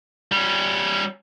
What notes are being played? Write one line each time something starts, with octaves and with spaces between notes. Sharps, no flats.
G3 C#4